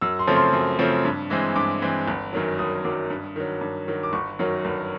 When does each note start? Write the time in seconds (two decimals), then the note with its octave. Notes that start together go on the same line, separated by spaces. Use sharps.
0.01 F#2 E6
0.19 C6
0.27 C#3 F3 A3 C4
0.36 C6
0.53 F#2
0.79 C#3 F3 A3 C4
1.05 G2
1.30 E3 G#3 C4
1.56 G2 D6
1.82 E3 G#3 C4
2.08 G1
2.33 F#2 D#3 F#3
2.59 G1 D#6
2.84 F#2 D#3 F#3 D6
3.10 G2
3.36 D#3 F#3
3.61 G2
3.88 D#3 F#3
4.03 D6
4.13 G1 C#6
4.39 F#2 D#3 F#3
4.65 G1